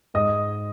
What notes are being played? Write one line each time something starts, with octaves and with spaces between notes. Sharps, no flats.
G#2 D#5 D#6